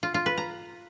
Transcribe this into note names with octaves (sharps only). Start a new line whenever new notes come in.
F4
F4
B4
A#5